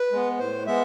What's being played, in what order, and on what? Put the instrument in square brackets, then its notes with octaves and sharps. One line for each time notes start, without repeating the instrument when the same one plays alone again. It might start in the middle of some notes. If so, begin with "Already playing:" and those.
Already playing: [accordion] B4
G#3 B3
A2 C5
G#3 B3 E5